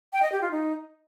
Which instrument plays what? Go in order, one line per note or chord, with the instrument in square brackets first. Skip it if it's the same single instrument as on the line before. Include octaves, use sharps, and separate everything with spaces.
[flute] G5
D#5
G4
F4
D#4